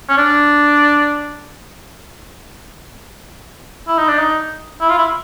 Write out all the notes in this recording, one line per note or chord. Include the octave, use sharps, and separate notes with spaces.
C#4
D4
E4
D#4
D4
D#4
E4
F4
E4